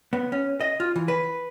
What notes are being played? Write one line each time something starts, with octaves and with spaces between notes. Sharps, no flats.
B3
C#4
D#5
F4
E3
B4